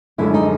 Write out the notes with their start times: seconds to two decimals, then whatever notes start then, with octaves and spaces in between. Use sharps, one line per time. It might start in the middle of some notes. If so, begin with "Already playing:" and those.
0.18 F#2 D3 F3 G#3 E4
0.34 D#4